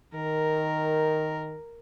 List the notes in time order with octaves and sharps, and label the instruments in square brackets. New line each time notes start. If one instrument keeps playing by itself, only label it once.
[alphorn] D#3 [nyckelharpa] A#4